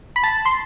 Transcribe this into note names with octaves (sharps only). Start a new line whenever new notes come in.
B5
A5
C6